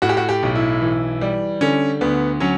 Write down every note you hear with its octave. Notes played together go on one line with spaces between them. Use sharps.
A2 F#4
G4
F#4
G4
B1
E4
E3
G3
D3 C#4
D2 B3
F#3 C#4